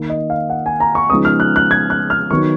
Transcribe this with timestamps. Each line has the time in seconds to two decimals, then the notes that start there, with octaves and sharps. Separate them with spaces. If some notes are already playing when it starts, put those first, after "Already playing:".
Already playing: D#3 A#3 D#4
0.10 D#5
0.30 F5
0.50 F#5
0.66 G#5
0.80 A#5
0.95 C#6
1.10 C#3 F3 G#3 B3 D#4 D#6
1.25 F6
1.40 F#6
1.56 F#6
1.71 G#6
1.90 F#6
2.10 F6
2.31 D#3 F#3 B3 D#4 C#6